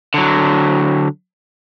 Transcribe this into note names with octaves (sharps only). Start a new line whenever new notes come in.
D3 F#3